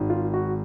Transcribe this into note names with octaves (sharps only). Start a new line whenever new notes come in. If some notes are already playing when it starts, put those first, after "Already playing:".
Already playing: G#1 G#2 D#3
F4
F#4